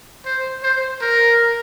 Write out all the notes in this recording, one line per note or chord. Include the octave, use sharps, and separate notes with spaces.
C5
C5
A#4